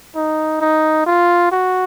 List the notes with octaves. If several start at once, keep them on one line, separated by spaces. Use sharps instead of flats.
D#4
D#4
F4
F#4